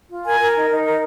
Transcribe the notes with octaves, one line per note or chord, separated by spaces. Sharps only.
F4
A#4 G#5
A#4
D#4
D#4
A#4